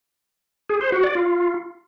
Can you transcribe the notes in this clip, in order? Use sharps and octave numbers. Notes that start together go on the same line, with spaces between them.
G#4
C5
F#4
D5
F4